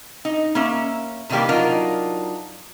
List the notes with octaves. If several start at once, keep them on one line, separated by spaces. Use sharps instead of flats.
D#4
A#3 C#4 E5
C3 D#3 E3 G3 A#3 G4
F#3 D4 D#4 F4 A#4